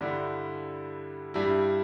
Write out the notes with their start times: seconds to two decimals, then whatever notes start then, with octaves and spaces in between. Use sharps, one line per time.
0.01 G2 D3 G3 E4
1.34 G2 G3 E4